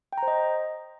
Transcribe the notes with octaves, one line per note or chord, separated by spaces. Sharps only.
G5
A#5
C5
D#5